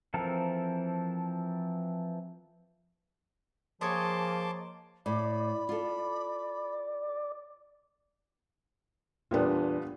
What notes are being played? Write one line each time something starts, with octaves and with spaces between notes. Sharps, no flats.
E3 F3 C4 A4 A#4
F3 A#3 G#4 C#5 D#5 A5 C6 D6
A2 D5 B5
F4 A4
E2 A#2 G3 B3 D4 F4